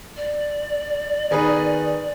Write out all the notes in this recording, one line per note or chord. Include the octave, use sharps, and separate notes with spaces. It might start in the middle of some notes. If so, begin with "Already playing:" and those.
D5
D#3 B3 D#4 G#4 B4